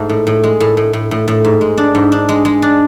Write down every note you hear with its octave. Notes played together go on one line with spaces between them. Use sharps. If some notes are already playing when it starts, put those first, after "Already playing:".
Already playing: G#2 A3
A2
A2
G#3
A2
A2
A2
A2
A2
G#2
G#3
D4
G#2
D4
G#3
G#3
D4